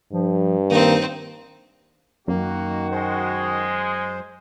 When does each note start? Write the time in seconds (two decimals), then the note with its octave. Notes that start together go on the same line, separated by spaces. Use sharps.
0.13 G2 F3
0.70 D#3 A#3 C4 D#4
2.28 F#2 D#3 A#3 F#4
2.91 G#3 C5